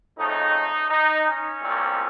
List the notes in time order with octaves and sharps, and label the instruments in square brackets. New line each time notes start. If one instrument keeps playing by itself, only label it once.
[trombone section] F2 C#3 A3 D#4
D#4
C#4
C2 A#2 A3 C4